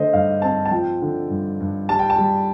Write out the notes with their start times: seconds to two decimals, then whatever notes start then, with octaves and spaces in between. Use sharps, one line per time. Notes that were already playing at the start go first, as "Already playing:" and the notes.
Already playing: D3 A3 C5 D#5
0.13 G2 F5
0.42 C4 A5
0.65 A5
0.71 F3 G5
1.02 D3
1.30 G2
1.60 G2
1.89 G3 A5
1.99 G5
2.10 A5
2.18 G3